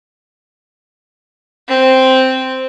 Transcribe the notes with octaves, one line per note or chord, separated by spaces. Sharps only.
C4